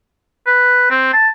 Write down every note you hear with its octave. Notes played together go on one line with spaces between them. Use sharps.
B4
C4
A5